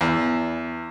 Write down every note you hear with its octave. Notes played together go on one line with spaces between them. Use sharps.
E2